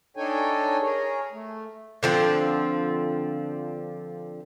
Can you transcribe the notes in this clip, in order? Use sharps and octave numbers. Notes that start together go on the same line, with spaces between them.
D4 D#4 A4 C#5 G5 G#5
G#4 A#4 C#5
A3
D3 F3 C4